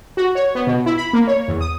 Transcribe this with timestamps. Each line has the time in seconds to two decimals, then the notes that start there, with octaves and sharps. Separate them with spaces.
0.17 F#4
0.35 C#5
0.55 B3
0.67 B2
0.86 E4
0.97 B5
1.13 A#3
1.27 C#5
1.48 E2
1.61 D#6